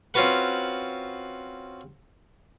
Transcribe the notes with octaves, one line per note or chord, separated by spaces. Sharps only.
C4 C#4 F4 F#4 B4 F#5